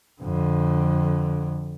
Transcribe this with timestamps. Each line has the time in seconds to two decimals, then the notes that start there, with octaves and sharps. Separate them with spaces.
0.22 F2 D3